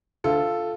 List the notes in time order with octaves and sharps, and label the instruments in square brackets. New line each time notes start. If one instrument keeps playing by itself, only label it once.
[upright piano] D2 F4 A4